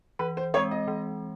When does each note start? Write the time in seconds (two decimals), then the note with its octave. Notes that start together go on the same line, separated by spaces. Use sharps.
0.19 E3 B4
0.37 C5
0.54 C4 C#5
0.57 G#3
0.71 D#5
0.88 E3